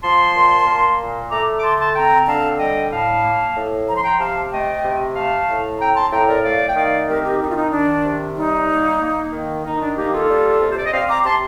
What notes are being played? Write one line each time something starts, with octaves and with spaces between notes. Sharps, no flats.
F3 A5 C6
A#2
A#3
A#2
A3 A#5 D6
D6
D3 A5 C6
A5 C6
C4 G5 A#5
D3 F5 A5
G3 D#5 G5
A2 F5 A5
A#3
A2
F3 A#5
C6
G5 A#5
C3 F5 A5
A3 D#5 G5
C3
A3 F5 A5
A2
C4 G5 A#5
A5 C6
A2 G5 A#5
A#4 D5
A3 D5 F5
G5
D#3 D5 F5
C4 G4 A#4
D#4 G4
D#3 D#4
F4
D#4
D#3 D4
C3
G3 D#4
A#3
A#3
D#3
D#3 D#4
D4
A#3 D#4 G4
F4 A4
G3
C3
C5
D5
D#5
C4 D5 F5
A#5 D6
C3 A5 C6